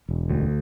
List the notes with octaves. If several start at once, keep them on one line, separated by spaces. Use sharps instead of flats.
E1
D2